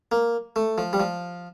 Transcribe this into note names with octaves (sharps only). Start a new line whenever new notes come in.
A#3
A3
F3
G3
F3